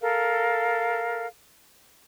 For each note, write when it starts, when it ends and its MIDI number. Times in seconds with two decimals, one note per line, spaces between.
0.01 1.27 69
0.01 1.27 70
0.01 1.27 77